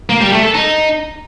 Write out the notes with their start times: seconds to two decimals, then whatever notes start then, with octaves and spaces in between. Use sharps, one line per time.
0.09 A#3
0.21 G3
0.32 A3
0.43 A4
0.54 D#4